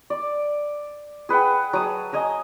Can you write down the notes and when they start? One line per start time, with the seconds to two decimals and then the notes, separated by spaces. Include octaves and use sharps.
0.10 D5
1.29 G#4 B4 F#5 G5
1.73 F#3 A5 D#6
2.13 D#5 G#5 A#5